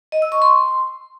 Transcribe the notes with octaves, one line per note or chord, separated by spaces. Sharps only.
D#5
E6
C#6
C6